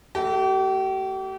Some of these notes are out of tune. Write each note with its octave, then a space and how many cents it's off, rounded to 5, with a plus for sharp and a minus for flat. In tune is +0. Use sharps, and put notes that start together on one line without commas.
A3 +15 G4 -40